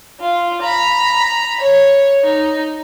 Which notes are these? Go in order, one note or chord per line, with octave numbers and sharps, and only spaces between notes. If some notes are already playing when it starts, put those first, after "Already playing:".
F4
A#5 B5
C#5
D#4